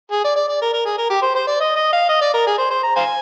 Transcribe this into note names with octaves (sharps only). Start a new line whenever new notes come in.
G#4
D5
D5
D5
A#4
A#4
G#4
A#4
G4
C5
C5
D5
D#5
D#5
F5
D#5
D5
A#4
G#4
C5
C5
A#5
C5 F5 G#5